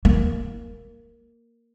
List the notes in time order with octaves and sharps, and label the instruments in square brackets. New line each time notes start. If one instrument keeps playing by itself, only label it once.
[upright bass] A#3